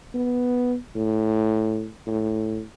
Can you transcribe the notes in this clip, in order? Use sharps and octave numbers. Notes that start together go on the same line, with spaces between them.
B3
A2
A2